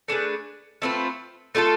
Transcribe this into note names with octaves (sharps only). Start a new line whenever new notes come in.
A3 D4 G#4 B4
A3 C4 F4 B4
A3 D4 F4 A4